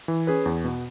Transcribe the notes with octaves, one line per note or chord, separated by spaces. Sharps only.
E3
C#4 G#4 B4
E2
B2 B3